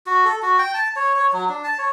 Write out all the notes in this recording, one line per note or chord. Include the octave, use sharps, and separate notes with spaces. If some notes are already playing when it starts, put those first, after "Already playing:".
F#4
A4
F#4
G5
A5
C#5
C#5
F#3
D4
A5
C#5